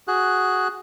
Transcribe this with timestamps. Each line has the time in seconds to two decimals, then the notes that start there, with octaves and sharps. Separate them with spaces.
0.08 F#4 G#4 F#6